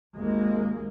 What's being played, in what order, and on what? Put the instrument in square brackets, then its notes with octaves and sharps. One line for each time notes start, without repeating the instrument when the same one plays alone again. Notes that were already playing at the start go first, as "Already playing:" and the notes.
[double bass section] G#1 D#2 G#2 G#3 A#3